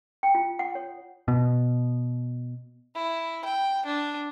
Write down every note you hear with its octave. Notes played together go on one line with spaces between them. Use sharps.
G5
F4
F#5
C#5
B2
E4
G5
D4